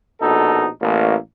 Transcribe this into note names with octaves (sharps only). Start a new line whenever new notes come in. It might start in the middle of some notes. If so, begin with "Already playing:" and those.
A#1 B2 D#4 A4
A1 A#3